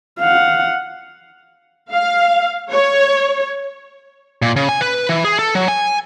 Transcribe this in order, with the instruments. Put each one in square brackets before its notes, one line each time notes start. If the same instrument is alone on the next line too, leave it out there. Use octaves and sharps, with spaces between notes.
[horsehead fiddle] F5 F#5
[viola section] F5
C#5
[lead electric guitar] A#2
C#3
G#5
B4
E3
G#4
A4
F#3
G#5